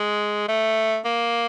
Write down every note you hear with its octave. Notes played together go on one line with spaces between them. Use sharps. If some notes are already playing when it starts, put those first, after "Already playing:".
Already playing: G#3
A3
A#3